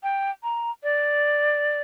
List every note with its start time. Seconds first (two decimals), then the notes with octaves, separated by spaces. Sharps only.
0.03 G5
0.43 A#5
0.83 D5